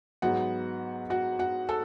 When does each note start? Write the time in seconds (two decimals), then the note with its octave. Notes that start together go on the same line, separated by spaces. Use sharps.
0.22 G#2 F#3 B3 F#4 F#5
1.10 F#4 F#5
1.39 F#4 F#5
1.69 A4 A5